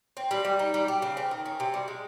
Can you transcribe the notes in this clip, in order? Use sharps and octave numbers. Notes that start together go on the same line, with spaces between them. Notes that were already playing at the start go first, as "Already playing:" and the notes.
C4
G3
G3
D#4
G3
G4
C#3
C4
D#3
C#4
C3
G3
G#3